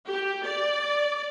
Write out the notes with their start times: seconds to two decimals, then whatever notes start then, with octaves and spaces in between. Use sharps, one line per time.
0.10 G4
0.45 D5